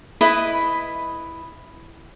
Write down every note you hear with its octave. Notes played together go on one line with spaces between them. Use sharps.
E4 B4 D#5